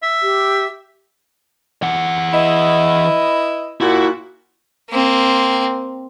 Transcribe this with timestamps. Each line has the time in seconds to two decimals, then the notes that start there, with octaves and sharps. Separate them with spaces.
0.03 E5
0.23 G4
1.82 E3 F#5
2.33 E4 B4 D#5
3.81 A#2 E4 F#4
4.90 A#3 C4